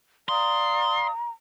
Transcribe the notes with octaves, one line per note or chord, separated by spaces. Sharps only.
D5 F5 A#5 C6 D#6